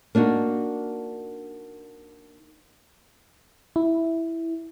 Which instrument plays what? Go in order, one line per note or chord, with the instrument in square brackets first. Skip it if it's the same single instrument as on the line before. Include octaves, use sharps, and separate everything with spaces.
[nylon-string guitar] A#3 D4 D#4 F#4
[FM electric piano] E4